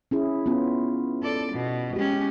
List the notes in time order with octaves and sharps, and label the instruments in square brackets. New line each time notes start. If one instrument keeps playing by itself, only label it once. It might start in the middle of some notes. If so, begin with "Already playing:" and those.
[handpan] C#4 E4 G#4
B3 C#4 F4
[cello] A4 D5
B2
[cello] G#3 C#4 [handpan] G4